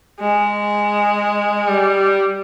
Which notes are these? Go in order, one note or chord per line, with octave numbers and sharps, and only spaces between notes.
G#3
G3